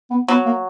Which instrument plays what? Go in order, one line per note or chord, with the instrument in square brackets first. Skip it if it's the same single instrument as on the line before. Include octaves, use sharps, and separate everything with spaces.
[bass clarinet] B3
[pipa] F#3 [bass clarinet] B3
[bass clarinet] A#3